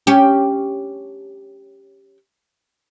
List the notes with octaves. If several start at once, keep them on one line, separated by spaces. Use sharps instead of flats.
C#4 G4